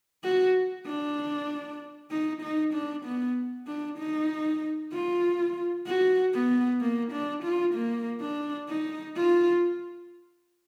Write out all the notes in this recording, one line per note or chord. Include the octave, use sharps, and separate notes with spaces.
F#4
D4
D#4
D#4
D4
B3
D4
D#4
F4
F#4
B3
A#3
D4
F4
A#3
D4
D#4
F4